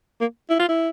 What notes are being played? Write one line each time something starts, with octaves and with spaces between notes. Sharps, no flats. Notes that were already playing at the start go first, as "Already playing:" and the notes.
A#3
E4
F4
E4